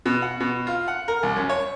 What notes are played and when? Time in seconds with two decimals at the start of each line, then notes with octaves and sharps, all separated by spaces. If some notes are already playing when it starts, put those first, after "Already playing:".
0.06 B2
0.22 F#5
0.40 B2
0.67 F4
0.88 F#5
1.08 A#4
1.23 C2
1.36 F#2
1.49 C#5